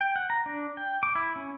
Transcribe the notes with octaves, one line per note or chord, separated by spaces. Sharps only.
G5
F#5
A#5
D4
G5
D6
E4
C#4